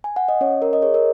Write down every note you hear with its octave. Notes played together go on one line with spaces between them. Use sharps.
G#5
F#5
D#5
C#4 C#5
A#4
D#5
G#4 C#5
A#4